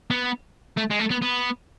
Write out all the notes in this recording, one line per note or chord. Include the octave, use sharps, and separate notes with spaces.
B3
A3
G#3
A3
B3
B3